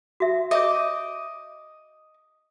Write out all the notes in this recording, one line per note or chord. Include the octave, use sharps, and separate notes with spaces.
F#4 E5
C#5 D#5 E5 D6